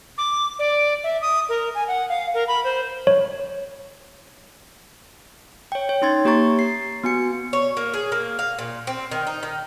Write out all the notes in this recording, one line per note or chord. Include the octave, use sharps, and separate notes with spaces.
D6
D5
E5
D#6
A#4
G#5
F#5
F5
A#4
B5
C5
C#5
C#5 G5
C#5
C#4 D#4 C6 G#6 A6
A#3 G4 C#5 A#5 C#6 A6
C7
B3 F#4 G#5 C#7
C#5
A#3
G#4
A#3
F5
A#2
C4
D#3
D#4
D#3